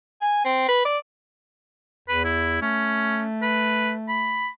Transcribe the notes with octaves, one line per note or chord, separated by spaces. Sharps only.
G#5
C4
B4
D5
E2 B4
E4
A3 C#4
B4
B5